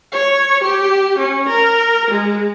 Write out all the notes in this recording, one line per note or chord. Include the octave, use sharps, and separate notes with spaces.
C#5
G4
C#4
A#4
G#3